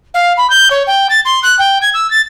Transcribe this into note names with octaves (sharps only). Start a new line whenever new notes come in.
F5
B5
G6
C#5
G5
A6
C6
F#6
G5
G#6
E6
A6